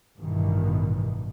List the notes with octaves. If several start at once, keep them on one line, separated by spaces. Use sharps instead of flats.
A1 G2 B2 D#3 E3